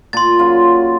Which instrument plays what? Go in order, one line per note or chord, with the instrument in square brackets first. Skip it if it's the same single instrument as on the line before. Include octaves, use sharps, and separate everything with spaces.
[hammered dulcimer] A#2 A#5 [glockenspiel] C6 A6
[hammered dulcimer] C#3 F#3 F4